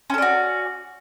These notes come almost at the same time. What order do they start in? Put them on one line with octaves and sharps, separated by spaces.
C#4 A4 D5 F#4